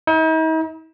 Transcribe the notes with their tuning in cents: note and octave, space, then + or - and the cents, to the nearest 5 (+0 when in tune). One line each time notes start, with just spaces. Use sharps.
D#4 +45